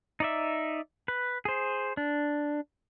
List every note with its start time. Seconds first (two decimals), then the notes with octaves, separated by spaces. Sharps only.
0.20 D#4 D5 E5
1.08 B4
1.45 G#4 C5
1.97 D4